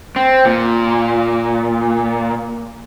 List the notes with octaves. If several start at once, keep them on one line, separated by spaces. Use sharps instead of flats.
C4
A#2